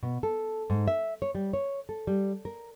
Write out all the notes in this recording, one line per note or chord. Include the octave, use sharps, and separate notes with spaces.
B2
A4
G#2
E5
C#5
G3
C#5
A4
G3
A#4